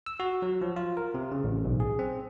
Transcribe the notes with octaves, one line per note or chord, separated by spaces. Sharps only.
E6
F#4
F#3
F3
F4
A#4
C3
C#3
A1
B1
G#4
C4